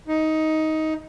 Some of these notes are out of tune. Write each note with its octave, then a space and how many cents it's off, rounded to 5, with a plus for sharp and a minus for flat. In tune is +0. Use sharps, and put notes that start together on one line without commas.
D#4 +15